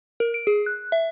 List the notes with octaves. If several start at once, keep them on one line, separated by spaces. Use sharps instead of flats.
A#4
D7
G#4
F#6
E5